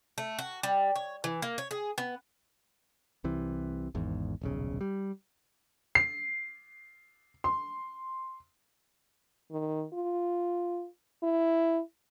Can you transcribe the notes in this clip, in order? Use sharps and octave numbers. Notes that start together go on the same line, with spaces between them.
A3
F#4
G3
C#5
E3
A#3
C#5
G#4
B3
C2 C3 E3
G#1 E2 G#2
D#1 B1 C#3
G3
C7
C6
D#3
F4
E4